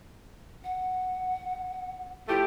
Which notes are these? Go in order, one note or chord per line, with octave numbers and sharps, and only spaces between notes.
F#5
F3 A3 E4 G4